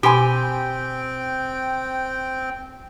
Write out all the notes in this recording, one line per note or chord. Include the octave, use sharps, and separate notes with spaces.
B2 C4 G4 G5 G#5 B5 C6